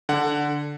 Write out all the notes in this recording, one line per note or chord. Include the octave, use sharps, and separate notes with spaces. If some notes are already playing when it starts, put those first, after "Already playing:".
D3 F#5